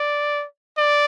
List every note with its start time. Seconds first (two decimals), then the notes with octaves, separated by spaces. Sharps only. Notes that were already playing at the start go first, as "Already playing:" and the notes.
Already playing: D5
0.77 D5